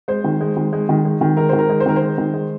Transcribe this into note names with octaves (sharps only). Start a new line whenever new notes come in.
G#3 C5
D#3
G#3
D#3
G#3
D#3
G#3
D#3
G#3 A#4
D#3 C5
A#4
G#3
C5
D#3 A#4
C5
G#3
D#3
G#3